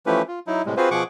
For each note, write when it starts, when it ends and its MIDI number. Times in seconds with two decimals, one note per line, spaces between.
0.06 0.22 52
0.06 0.22 53
0.06 0.22 57
0.06 0.22 61
0.06 0.22 67
0.06 0.22 71
0.28 0.39 65
0.47 0.62 54
0.47 0.62 63
0.47 0.62 64
0.66 0.75 45
0.66 0.75 48
0.66 0.75 55
0.66 0.75 56
0.77 0.89 60
0.77 0.89 65
0.77 0.89 66
0.77 0.89 68
0.77 0.89 71
0.77 0.89 72
0.91 1.03 47
0.91 1.03 53
0.91 1.03 68
0.91 1.03 78
0.91 1.03 85
0.91 1.03 86